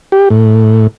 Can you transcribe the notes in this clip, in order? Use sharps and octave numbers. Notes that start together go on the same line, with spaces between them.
G4
A2